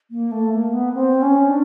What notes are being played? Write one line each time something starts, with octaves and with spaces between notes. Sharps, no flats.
A#3
A3
A#3
B3
C4
C#4
D4